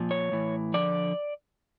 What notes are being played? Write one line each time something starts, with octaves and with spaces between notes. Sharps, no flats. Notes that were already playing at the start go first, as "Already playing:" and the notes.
Already playing: A#2 F3
C#5
A2 E3
D3 F3 D5